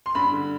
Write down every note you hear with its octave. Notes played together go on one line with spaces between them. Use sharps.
C6
G2 B5
D3